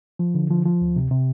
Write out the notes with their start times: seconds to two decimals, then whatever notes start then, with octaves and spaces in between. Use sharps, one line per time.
0.19 F3
0.35 D3
0.50 F3
0.65 F3
0.81 D2
0.96 C3
1.11 C3